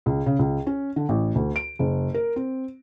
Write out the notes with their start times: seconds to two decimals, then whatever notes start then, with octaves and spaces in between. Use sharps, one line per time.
0.06 C#2
0.26 C#3
0.39 C#2
0.67 C#4
0.96 D3
1.09 A1
1.35 D2
1.56 D7
1.79 F#1
2.14 A#4
2.36 C4